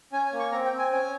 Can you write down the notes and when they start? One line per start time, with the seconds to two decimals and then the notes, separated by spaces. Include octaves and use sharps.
0.12 C#4 G#5
0.26 G#5
0.32 A#3
0.39 C#6
0.52 C4 A#5
0.65 G5
0.72 C4
0.79 G#5
0.91 C#4 G#5